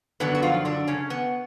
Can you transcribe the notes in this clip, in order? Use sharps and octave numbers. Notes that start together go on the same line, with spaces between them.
F#2 D3 F#3 B3 B4
F#4
F3 F4
D3 D4
C#3 C#4
B3